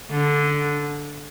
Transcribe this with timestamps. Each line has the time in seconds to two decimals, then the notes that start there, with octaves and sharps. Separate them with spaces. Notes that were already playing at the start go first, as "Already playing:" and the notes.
0.11 D3